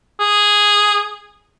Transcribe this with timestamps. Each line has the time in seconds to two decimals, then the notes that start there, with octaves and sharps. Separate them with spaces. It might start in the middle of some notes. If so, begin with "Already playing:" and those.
0.20 G#4